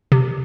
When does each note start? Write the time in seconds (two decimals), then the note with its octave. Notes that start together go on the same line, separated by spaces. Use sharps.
0.12 C3